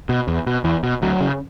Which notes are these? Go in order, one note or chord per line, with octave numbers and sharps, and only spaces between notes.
B2
E2
B2
E2 E3
B2
D2 F#3
C#3